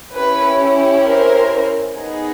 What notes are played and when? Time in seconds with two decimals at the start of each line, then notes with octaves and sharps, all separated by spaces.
0.14 C#4 E4 G4 B4
1.05 A#4 C5
1.96 B3 D#4 G#4